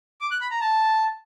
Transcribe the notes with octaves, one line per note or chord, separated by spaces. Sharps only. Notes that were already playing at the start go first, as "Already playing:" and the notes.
D6
F#6
B5
A#5
A5